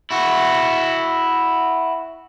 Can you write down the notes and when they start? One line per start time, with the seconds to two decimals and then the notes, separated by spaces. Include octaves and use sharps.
0.10 E4 F#4